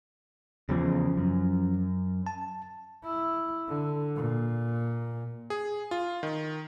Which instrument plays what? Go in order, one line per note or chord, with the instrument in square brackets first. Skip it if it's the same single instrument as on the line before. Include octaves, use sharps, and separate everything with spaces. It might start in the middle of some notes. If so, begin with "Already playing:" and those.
[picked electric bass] E2 C#3 [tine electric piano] F3 C#4
[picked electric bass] F#2
[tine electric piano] A5
[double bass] E4
D3
A#2
[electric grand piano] G#4
F4
D#3